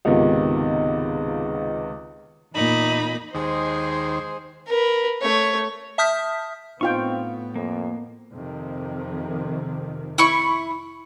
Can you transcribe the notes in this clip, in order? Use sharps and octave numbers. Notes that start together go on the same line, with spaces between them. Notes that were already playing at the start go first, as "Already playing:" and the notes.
C#2 G#2 C3 D#3 B3 F4
E2 A#2 A#3 D#4 B5
D#2 G#3 G#4 C5
A#4 B4
A3 C#5
E5 A5 D#6 F6 G6 B6
A2 B3 C4 D#4 F4 F5 G5 C#6
F2 A#3
F2 C3 D#3
E4 B5 C#6